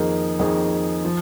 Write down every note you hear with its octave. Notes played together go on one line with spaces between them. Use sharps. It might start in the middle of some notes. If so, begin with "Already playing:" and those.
Already playing: F2 D#3 A#3 D#4 G#4
F2 D#3 A#3 D#4 G#4
F3